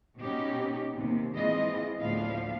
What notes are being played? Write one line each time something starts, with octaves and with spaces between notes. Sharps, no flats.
B2 B3 C#4 D#4 G4
D#2 C3
E3 G#3 C4 F4 G#4 D#5
D2 A2 F3 B3 D4 F5